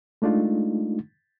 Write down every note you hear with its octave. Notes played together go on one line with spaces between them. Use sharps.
G#3 A3 D4 D#4 F4